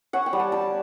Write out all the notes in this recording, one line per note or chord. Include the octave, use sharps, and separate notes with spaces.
C#4 F#5
G5
G3
A5
G3 A5